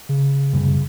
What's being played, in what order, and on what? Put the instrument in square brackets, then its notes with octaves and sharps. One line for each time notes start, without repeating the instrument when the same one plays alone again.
[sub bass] C#3
[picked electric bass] F#1 C2